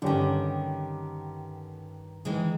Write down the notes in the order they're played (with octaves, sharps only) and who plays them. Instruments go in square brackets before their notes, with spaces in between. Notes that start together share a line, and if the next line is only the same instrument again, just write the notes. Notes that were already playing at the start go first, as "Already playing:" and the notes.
[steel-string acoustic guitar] G2 D#3 [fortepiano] D3 C#4 G4
[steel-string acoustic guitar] D#3 E3 G#3